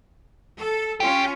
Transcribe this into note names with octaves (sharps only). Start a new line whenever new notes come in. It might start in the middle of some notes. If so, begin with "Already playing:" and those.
A4
C#4 F4 G4